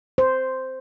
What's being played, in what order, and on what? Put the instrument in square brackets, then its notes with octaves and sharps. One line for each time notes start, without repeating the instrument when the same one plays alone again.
[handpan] C5